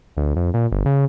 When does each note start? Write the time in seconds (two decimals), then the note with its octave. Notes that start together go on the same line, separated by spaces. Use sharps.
0.17 D2
0.36 F2
0.54 A#2
0.72 G1
0.86 C#3